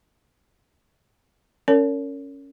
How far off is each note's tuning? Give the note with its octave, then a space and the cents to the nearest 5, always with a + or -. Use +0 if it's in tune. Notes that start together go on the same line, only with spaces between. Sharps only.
C#4 +0 A#4 -30 C#5 +30